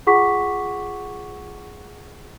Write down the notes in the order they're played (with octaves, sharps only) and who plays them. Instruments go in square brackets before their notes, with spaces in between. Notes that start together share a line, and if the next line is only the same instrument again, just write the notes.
[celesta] F4 G#4 F#5 C#6 D6 B6